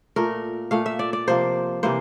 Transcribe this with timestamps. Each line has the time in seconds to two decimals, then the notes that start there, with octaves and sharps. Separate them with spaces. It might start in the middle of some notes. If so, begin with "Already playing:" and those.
0.16 A#2 A3 A#4
0.71 A#2 A3 F5
0.86 E5
0.99 D5
1.13 D5
1.28 C3 F3 A#3 C5
1.83 C3 E3 A#3 C5